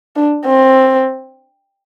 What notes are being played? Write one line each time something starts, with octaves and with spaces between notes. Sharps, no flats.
D4
C4